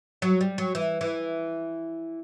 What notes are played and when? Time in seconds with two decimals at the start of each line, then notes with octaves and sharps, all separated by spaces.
0.22 F#3
0.41 G3
0.58 F#3
0.75 E3
1.01 E3